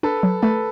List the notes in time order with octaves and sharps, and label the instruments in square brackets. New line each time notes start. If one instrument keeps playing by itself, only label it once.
[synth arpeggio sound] D4 [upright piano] A4 B4
[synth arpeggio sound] F#3
[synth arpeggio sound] A3 [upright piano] A4 B4